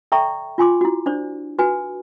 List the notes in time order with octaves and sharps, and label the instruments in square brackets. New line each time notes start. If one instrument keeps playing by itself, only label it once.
[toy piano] A4 D5 E5 G5 A#5 C#6
F4 G#5 C6 D6
E4 F#4
D4 C5 D5
F#4 B4 G#5